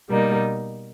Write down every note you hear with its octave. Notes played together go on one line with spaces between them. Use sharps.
B2 G3 A#3 D#4